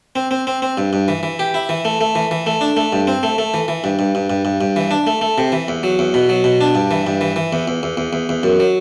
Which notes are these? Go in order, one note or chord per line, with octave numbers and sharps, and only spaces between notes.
C4
C4
C4
C4
G2
G2
E3
E3
G4
E4
E3
A3
A3
E3
E3
A3
D4
A3
G2
C4
A3
A3
E3
E3
G2
G2
G2
G2
G2
G2
E3
D4
A3
A3
C3
E3
E2
F#3
E2
B2
F#3
B2
D4
G2
E3
G2
E3
E3
E2
E2
E2
E2
E2
E2
F#2
F#3